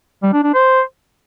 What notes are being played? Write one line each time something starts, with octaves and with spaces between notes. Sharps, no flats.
G3
D4
D4
C5